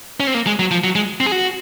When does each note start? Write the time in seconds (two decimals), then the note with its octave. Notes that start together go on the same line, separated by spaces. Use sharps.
0.20 C#4
0.27 C4
0.34 A#3
0.47 G#3
0.59 F#3
0.71 F3
0.84 F#3
0.95 G#3
1.20 C4
1.26 G#4
1.32 F#4